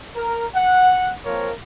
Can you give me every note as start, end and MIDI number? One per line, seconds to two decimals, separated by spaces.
0.17 0.47 70
0.55 1.12 78
1.26 1.52 53
1.26 1.52 58
1.26 1.52 60
1.26 1.52 70
1.26 1.52 73